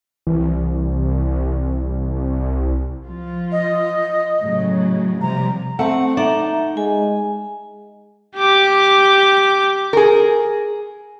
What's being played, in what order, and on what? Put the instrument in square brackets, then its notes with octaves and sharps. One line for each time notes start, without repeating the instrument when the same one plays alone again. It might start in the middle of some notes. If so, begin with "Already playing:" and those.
[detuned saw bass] C2 [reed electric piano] E3
[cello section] F3 F4
[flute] D#5
[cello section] A2 C#3 F#3
[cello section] C3 F3 G3 [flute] A#5
[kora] A3 [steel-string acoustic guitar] C4 F#5
[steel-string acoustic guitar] D#4 [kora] D5 [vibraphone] E5 F#5 A#5
[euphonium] G#3 [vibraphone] G#5
[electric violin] G4 D6
[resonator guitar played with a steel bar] G#4 A#4